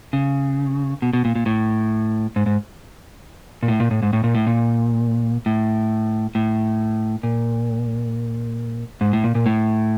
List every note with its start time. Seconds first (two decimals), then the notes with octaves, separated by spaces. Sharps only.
0.13 C#3
1.02 B2
1.13 B2
1.25 A#2
1.35 A#2
1.46 A2
2.36 G#2
2.46 G#2
3.63 A#2
3.68 A2
3.80 A#2
3.91 A2
4.03 G#2
4.13 A2
4.24 A#2
4.35 A2
4.47 A#2
5.46 A2
6.35 A2
7.23 A#2
9.01 G#2
9.13 A2
9.24 A#2
9.35 A#2
9.46 A2